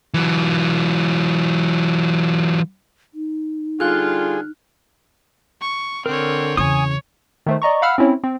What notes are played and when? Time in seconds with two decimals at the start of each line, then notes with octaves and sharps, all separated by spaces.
0.14 E3 F#3
3.14 D#4
3.80 D3 G3 F4 G#4 F6 F#6
5.62 C#6
6.06 D3 C4 A#4 C#5
6.57 E2 C#3 C#5 G#5 D#6
7.46 D#3 A3 C5
7.62 D5 D#5 A#5 C#6
7.82 F5 F#5 B5 E6 F6
7.98 C4 C#4 E4 C#5
8.24 C4